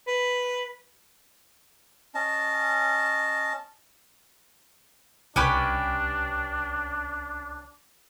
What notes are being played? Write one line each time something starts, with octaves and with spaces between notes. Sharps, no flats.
B4
C#4 D#5 A5
C2 C#4 D4 G4 B4